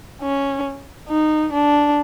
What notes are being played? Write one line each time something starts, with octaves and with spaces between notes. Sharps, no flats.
C#4
D#4
D4